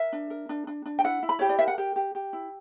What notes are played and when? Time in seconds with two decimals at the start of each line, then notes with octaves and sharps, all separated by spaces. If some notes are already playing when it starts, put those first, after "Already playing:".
Already playing: A#4 E5
0.13 D4
0.30 A#4
0.49 D4
0.67 D4
0.86 D4
0.99 G5
1.04 E4 F#5
1.23 E4
1.29 B5
1.39 G4 C#5
1.49 D5
1.59 A#4 E5
1.68 F#5
1.78 G4 G5
1.96 G4
2.15 G4
2.33 E4